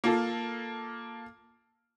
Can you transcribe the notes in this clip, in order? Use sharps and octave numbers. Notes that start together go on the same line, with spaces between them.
A#3 F4 A4